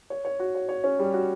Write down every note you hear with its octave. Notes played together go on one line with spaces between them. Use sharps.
C#5
C#5
F#4
C#5
C#5
C#4
G3
F#4